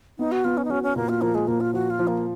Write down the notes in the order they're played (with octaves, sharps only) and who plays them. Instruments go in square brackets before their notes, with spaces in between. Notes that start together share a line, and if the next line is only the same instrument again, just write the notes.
[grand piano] B3 [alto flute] D#4
[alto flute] F#4
[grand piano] B3 [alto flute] F4
[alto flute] C#4
D#4
[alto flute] C#4 [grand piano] F#4
[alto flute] C#4
[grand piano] A#2 [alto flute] A#3
[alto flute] F4
[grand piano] F3 [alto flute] A#3
[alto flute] G#3
[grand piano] A#2 [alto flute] A#3
[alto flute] F4
[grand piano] F3 [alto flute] F#4
[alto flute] F4
[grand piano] F3
[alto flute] A#3